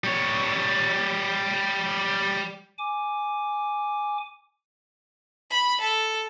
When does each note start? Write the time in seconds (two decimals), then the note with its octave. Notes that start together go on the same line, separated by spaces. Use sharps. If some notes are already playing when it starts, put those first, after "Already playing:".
0.04 G3 C#5
2.78 G#5 D6
5.51 B5
5.81 A4